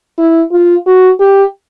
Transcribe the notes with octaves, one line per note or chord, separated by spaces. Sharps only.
E4
F4
F#4
G4